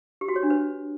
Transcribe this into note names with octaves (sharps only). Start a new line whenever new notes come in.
G4
F#4
C#5
D4
B4